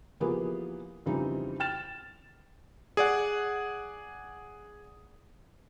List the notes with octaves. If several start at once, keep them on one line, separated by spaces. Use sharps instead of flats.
E3 F3 A#3 B3 G4 G#4
F2 C#3 E3 G3 C4 D#4
G5 F6 A6 E7
G#4 D5 F#5